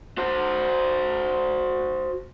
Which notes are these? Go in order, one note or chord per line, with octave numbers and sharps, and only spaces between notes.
F#4 C5